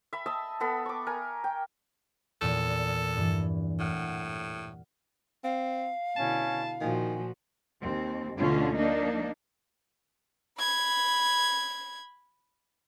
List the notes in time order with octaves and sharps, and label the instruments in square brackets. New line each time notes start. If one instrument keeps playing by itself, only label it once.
[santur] E5 B5
D#5 E5 A5 E6
B3 A4 B5
C#6 D6
A#4 G#5
G5
[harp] E2 A#2 D5 [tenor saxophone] A4
[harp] G2 E3
[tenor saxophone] A2 [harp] F#5 F6
[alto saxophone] C4 [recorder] F5
[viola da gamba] B2 D3 E4 [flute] C#4 [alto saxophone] A5
[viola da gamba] A#2 F3 F#4 [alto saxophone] D#3 [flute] G#5
[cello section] D#2 C4
D2 B2 D3 C#4 F4
F3 A#3 D4 D#4
[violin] B5 G#6